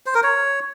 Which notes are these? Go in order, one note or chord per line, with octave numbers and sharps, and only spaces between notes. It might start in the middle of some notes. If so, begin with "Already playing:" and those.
C5
A#4
C#5